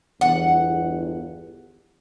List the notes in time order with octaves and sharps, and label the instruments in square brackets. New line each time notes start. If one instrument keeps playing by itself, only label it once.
[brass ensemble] G1 E2 [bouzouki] F#5